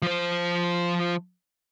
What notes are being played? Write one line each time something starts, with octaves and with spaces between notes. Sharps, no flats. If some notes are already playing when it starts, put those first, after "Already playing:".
F3 C5